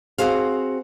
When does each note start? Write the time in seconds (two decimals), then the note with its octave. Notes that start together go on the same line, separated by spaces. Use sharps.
0.18 C4 F#4 G#4 C5 F5